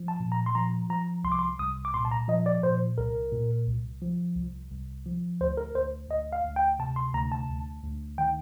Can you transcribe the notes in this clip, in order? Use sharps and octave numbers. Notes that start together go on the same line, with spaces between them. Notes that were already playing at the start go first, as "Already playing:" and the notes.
Already playing: F3
A5
A#2
A#5
C6
F3 A#5
F3 A#5
C2 C6
D6
C6
C2 D#6
D6
A#2 C6
A5
A#5
F3 D#5
D5
A#2 C5
C2 A#4
A#2
C2
F3
C2
C2
F3
D2 C5
A#4
D2 C5
D2 D#5
F5
D2
G5
C3 A5
C6
D2 A#5
A5
D2
D2
D#3 G5